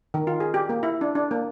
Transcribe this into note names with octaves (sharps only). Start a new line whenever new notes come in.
D#3
F4
G#4
G4
A#3
E4
D4
D4
A#3